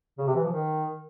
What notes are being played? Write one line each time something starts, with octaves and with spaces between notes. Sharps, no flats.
C#3
C3
E3
F3
D#3